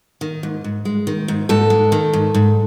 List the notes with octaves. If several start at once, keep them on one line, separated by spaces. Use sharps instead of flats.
D#3
G#2
G#2
G#3
D#3
G#2
G#2 A4
G#3
D#3
G#2
G#2